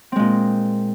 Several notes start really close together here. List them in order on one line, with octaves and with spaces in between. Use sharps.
C4 G#3 A#2